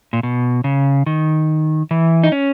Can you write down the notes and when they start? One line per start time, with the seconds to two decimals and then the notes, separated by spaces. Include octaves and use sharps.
0.13 A#2
0.23 B2
0.64 C#3
1.06 D#3
1.91 E3
2.24 D#4
2.32 C#4